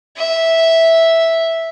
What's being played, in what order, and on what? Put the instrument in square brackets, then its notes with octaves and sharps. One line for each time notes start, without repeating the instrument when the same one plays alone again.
[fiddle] E5